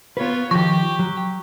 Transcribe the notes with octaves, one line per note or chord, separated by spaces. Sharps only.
B3 F4 B4 C#5
D#3 F3 G4 C#6
F#3